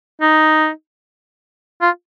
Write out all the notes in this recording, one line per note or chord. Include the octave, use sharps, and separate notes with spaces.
D#4
F4